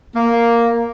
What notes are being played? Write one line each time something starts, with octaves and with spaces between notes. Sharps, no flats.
A#3